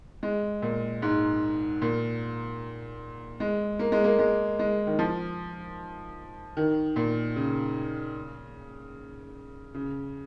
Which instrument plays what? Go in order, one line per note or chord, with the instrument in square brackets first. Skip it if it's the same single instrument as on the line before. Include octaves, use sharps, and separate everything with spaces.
[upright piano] G#3
A#2
G#2
A#2
G#3
A#3
G#3
A#3
G#3
G#3
D#3
F3
D#3
A#2
C#3
C#3